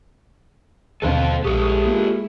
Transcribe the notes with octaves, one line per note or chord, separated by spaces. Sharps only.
D#2 B2 D3 B3 C4 A4 C5 F5
A#1 G#3 A3 E4 G4 A4 C#6 D#6
A#3 F4